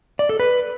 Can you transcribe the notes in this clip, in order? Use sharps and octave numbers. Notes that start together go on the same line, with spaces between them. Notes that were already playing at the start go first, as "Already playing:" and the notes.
D5
A4
B4